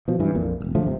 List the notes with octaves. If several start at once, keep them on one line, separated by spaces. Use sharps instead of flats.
B2 F3
G2 E3
A#1 F2 A#2
E1 B1
D3 F3 A3
G1 C3